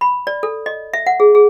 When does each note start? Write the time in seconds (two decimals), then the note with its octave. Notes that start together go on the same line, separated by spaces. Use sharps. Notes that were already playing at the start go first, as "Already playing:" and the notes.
0.01 B5
0.27 D5
0.43 A4
0.66 D#5
0.94 E5
1.07 F#5
1.20 G#4
1.35 G#4